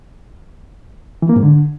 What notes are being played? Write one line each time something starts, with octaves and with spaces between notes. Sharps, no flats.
E3
A#3
G#2
D3